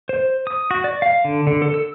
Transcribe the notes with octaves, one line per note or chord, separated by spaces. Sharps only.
C5
D#6
F#4
D5
F5
D3
D3
A4
E6